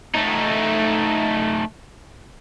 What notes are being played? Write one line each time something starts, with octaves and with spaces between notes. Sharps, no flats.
A3 D#4